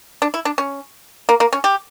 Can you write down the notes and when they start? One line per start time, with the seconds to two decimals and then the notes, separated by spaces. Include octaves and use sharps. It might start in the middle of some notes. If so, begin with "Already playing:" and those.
0.22 D4
0.34 E4
0.45 D4
0.58 C#4
1.29 A#3
1.40 A#3
1.53 C#4
1.64 G4